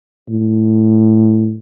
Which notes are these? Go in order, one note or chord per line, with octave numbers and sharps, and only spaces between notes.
A2